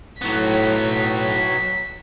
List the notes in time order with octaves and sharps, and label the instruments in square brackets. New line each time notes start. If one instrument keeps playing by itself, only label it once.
[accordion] A2 [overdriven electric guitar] F#3 B3 [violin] B6